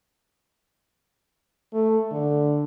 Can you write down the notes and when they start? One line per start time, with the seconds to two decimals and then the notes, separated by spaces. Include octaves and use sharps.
1.73 A3
2.11 D3